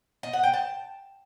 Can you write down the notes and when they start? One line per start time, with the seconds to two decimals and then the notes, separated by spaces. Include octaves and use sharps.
0.23 D#5
0.33 F#5
0.43 G5
0.53 A5